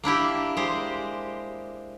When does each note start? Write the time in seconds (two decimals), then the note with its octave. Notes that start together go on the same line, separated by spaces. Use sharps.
0.04 A#3 D4 E4 G4
0.57 G#3 G4 C5